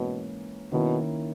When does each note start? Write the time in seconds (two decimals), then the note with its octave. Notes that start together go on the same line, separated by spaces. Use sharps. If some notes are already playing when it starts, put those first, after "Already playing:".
Already playing: G#2 B2 E3 A#3 C#4
0.72 B2 D#3 A#3 C#4 E4